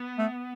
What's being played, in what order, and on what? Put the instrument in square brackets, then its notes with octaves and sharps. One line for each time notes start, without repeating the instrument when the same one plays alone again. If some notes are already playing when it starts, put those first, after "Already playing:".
Already playing: [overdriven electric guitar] B3
[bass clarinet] A3